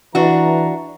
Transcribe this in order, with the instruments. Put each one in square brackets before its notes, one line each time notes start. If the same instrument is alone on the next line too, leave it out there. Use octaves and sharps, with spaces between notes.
[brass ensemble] E3 A#5 [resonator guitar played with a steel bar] D4 F#4